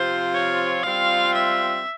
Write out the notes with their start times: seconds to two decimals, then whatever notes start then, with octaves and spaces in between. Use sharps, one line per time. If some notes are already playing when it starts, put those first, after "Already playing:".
Already playing: C3 F3 C4 F4 C5
0.34 C#5
0.84 G3 C4 F4 F5
1.34 E5